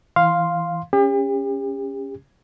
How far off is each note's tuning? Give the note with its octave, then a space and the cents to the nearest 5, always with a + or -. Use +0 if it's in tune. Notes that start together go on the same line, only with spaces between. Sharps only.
E3 +0 F5 +0 C6 +0
C#4 +0 G4 +40